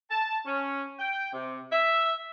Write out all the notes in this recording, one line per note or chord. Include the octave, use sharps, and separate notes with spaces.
A5
C#4
G5
C3
E5